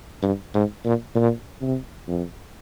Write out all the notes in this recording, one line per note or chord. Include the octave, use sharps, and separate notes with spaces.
G2
G#2
A#2
A#2
C3
F2